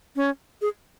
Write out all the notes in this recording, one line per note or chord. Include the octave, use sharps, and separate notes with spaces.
C#4
G#4